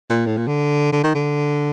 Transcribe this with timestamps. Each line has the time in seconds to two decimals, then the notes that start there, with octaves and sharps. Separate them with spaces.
0.10 A#2
0.27 A2
0.37 A#2
0.48 D3
0.93 D3
1.04 D#3
1.15 D3